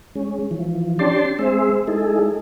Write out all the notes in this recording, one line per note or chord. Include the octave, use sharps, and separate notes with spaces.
G#3 C#4
E3 F3
C#4 D4 G4 D5 A5 C6
G#3 C4 G#4 C5 E5
G#3 D#4 E4 G#4 A4